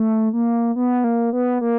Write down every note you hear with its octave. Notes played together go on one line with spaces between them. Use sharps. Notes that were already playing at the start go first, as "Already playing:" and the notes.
Already playing: A3
A#3
B3
A#3
B3
A#3